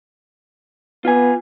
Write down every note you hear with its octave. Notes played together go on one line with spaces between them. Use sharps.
B3 F4 G#5